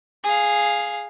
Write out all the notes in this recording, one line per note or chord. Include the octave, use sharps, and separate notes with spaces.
G#4 F5